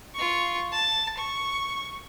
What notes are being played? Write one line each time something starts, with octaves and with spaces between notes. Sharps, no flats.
F4 C#6
A5
C#6